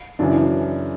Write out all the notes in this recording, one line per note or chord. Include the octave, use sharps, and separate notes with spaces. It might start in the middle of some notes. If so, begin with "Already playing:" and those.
F#2 C#3 E3 D4
D4